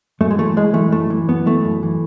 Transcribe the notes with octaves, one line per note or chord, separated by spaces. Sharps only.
F#2 A3
G#3
E3 A3
F#2 G#3
E3 A3
F#2 A3
E3
F#2 B3
E3 A3
F#2
E3